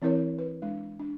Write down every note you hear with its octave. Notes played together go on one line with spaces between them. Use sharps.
E3 C4 E4 A#4 C#5
B4
G#3 D4
D4